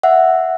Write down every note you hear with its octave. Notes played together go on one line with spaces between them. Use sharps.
E5 F#5